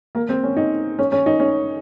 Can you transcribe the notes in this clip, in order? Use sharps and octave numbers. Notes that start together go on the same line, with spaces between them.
A#3
C4
C#4
D#4
C#4
C#4
D#4
C#4